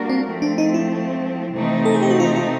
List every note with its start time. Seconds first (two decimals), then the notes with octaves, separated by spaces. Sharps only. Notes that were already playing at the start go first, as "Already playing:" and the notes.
Already playing: G3 A#3 D4 F#4 A#4
0.10 C4
0.26 F3 A3 C4
0.42 D4
0.58 D#4
0.74 E4
1.55 C3 E3 A3 C4 D#4
1.85 A4
1.94 G#4
2.03 G4
2.11 F#4
2.20 F4
2.36 F4